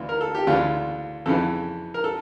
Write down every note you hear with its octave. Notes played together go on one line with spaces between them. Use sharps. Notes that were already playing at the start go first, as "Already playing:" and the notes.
Already playing: D2 E3 F4
A#4
A4
G4
D2 C#3 E3 F4
F2 C#3 E3 A4
A#4
A4